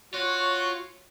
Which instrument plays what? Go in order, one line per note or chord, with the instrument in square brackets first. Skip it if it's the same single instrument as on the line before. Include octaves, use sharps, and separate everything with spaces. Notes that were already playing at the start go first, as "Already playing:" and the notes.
[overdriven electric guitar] F4 [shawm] F#4 [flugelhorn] C#5